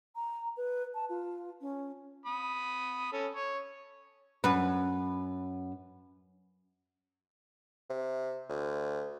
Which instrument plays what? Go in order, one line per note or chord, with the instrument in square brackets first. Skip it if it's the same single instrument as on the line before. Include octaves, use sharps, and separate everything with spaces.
[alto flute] A#5
B4
A5
F4
C#4
[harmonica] B5 D#6
C#4 A4
C#5
[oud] F#2 B4
[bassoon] C3
D2